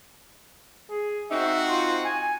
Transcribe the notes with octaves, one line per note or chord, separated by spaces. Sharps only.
G#4
C4 D#4 F#4 E5
F4
G#5